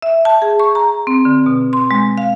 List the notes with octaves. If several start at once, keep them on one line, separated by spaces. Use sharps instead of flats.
E5
A5
G#4
C#6
A#5
C4
D3
B2
C6
G#3
F5